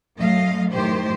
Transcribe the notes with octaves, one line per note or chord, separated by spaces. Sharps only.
F#2 F#3 A3 D#5 F5
F#2 A2 D#3 A3 G4 C5